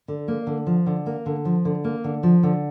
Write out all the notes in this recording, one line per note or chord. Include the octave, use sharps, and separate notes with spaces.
D3
A#3
D3
F3
D3
A#3
D3
F3
D3
A#3
D3
F3
D3